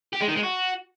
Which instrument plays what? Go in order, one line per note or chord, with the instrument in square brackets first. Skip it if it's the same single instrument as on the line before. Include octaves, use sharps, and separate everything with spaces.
[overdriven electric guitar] G4
G#3
D#3
G#3
F#4